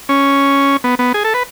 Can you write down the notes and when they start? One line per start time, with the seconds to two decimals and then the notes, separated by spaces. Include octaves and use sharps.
0.09 C#4
0.84 B3
0.99 B3
1.14 G#4
1.24 A4
1.34 B4